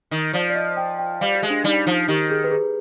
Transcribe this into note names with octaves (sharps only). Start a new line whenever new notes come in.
D#3
F3 D5
D5
D#5
G5
G5
G3 F5
G4
G#3
D4
G3 D#4
F3 D#4
D#3 G4
G#4
B4
G#4